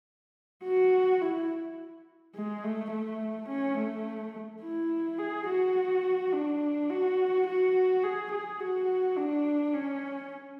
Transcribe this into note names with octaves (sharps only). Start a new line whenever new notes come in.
F#4
E4
G#3
A3
A3
C#4
A3
E4
G#4
F#4
D4
F#4
F#4
G#4
G#4
F#4
D4
C#4